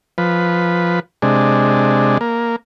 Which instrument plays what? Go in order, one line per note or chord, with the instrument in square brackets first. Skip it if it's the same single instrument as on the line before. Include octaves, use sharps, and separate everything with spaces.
[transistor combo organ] F3 B4
C3 G#3 D4
A#3